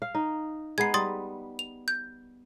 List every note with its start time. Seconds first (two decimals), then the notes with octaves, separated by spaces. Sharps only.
0.02 F5
0.15 D#4
0.78 G#3 B3 D#4 G#6 C7
0.94 G3 C6 D#6 A6
1.59 F7
1.88 G6